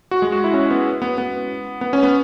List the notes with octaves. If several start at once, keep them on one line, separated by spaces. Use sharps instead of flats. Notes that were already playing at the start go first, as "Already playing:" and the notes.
F#4
G#3
F#4
E4
C#4
B3
B3
B3
B3
C#4
B3